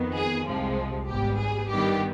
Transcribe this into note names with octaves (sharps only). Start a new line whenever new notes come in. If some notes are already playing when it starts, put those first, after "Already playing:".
Already playing: F2 D#3 B3
G#4
C2 C3 F3 G#3
G#1 G#2 G3 B3 G4
G#4
G2 D#3 G3 B3 G4